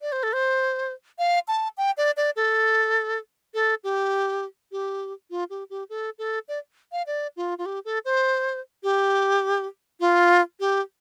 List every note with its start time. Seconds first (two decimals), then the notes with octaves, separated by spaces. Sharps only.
0.02 D5
0.12 C5
0.23 A4
0.34 C5
1.19 F5
1.48 A5
1.77 G5
1.97 D5
2.17 D5
2.36 A4
3.54 A4
3.84 G4
4.72 G4
5.30 F4
5.50 G4
5.70 G4
5.89 A4
6.18 A4
6.48 D5
6.92 F5
7.07 D5
7.36 F4
7.58 F4
7.66 G4
7.85 A4
8.05 C5
8.83 G4
10.00 F4
10.60 G4